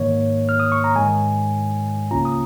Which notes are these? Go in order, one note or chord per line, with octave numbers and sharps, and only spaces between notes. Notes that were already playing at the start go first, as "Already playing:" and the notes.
Already playing: G#2 D#3 A#3 C#5
F6
D#6
C#6
A#5
G#2 D#3 G#3 G#5
C#2 C#3 A#3 C#4 F4 A#5
D#6